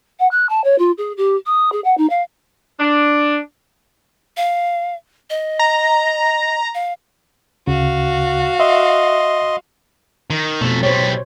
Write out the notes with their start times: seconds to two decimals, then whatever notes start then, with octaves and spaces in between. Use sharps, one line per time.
0.20 F#5
0.31 F#6
0.50 A5
0.64 C#5
0.79 F4
0.98 G#4
1.17 G4
1.46 D#6
1.72 G#4
1.84 F#5
1.98 D#4
2.10 F5
2.80 D4
4.37 F5
5.30 D#5
5.59 A#5
6.75 F5
7.67 D2 C#3 F#4 F5
8.60 D#5 E5 C6
10.30 D#3
10.61 F2 B2 A3
10.83 B1 G3 C5 C#5